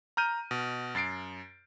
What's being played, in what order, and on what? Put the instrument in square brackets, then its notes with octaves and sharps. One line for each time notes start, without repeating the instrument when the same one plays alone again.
[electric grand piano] A#5 F6 G6 D#7
B2
F#2 A6 C7 D7